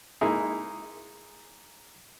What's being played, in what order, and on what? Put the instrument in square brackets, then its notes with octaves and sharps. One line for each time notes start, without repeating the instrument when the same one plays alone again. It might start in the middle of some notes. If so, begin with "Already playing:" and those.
[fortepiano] G#3 A#3 D#4 E4 G#4